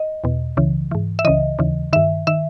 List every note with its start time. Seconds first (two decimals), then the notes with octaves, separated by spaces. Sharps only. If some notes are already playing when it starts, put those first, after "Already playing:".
Already playing: D#5
0.24 E2 B2
0.57 C#2 C#3 E3
0.91 G#2 E3
1.19 E5
1.25 C#2 C#3 E3 D#5
1.59 D#2 C#3 E3
1.93 G2 D#3 E5
2.27 D#3 E5